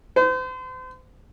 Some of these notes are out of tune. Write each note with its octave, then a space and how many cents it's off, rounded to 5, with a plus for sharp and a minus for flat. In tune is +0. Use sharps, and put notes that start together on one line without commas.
C5 -40